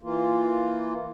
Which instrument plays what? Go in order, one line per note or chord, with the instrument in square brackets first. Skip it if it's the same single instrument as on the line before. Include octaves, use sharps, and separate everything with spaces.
[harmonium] E3 A#3 F4